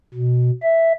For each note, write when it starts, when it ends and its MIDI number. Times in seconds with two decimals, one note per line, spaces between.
0.14 0.50 47
0.63 0.93 76